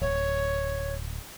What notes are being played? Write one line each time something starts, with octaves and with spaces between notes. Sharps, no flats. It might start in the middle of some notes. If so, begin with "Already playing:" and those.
D1 C#5